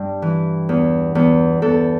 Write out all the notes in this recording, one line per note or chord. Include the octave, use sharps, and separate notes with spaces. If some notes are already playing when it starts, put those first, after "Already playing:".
Already playing: G2 G4
E3
E2
E2
E2 A4